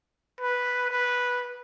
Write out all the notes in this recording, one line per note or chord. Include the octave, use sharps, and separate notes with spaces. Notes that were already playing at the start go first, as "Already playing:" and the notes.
B4
B4